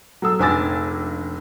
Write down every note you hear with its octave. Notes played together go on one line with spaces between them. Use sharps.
F#3 A4 E6
F1 A#1 G#5 D6 E6 A6